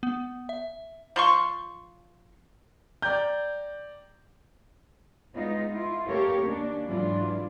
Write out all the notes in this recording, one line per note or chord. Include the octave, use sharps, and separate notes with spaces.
B3
E5
F3 C6 C#6
D5 G5 A#5 G6
G#3 B3 D#4 F4
E4 F4
A#3 G4 A4 A#4 C#5 F5
D#2 A#3 C#4 D4
G#2 E3 F#3 D4 E4 F4